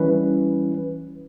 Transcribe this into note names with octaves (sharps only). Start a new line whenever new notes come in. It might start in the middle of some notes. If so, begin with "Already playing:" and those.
Already playing: E3 G3 C#4 E4 B4